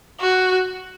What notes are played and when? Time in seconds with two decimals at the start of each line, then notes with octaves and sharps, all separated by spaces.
0.20 F#4